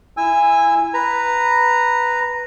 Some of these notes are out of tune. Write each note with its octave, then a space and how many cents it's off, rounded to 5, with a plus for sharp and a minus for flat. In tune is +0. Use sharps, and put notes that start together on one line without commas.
E4 +20 G#5 -15 E6 +0
B4 +0 A#5 -5